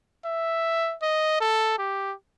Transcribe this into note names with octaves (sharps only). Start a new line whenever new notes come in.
E5
D#5
A4
G4